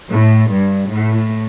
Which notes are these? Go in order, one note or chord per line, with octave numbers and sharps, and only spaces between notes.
A2
G2
A2